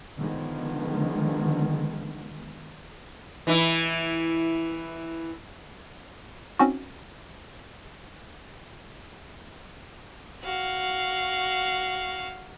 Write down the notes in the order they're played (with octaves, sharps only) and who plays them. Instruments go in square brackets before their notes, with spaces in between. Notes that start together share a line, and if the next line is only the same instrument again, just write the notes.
[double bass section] D3 D#3 F3 G#3 B3
[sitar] E3 E4
[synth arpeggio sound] C4 C#4 D#4 F#4
[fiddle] F#4 F5